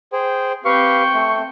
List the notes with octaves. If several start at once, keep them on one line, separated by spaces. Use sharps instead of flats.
G#4 C5 G5
C4 G4 B4 F5 G5 C#6
A3